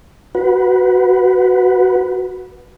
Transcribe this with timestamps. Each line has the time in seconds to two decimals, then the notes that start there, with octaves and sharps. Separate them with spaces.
0.35 F#4 B4